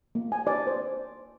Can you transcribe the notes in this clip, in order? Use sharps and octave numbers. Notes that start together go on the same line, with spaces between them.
A#3
G#5
D5
C5